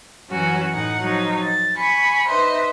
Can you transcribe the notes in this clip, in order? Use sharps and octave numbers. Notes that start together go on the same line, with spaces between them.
F#2 E3 F#3 C#4 F#4
A2 D#4 F#5
F3 F#3 D#4
A6
G#5 B5 C#6
D#4 B4 C5 D#5 E5